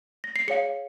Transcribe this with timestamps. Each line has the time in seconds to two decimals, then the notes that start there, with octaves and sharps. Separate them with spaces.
0.24 A#6
0.36 C7
0.48 G#4 C#5 F5 C#7